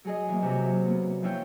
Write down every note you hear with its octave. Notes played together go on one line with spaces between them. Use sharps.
F#3 G#4 D#5
E3 A#3
C3 F#3
A#3 B3
F3 F#3 E4 F4 C#5 G5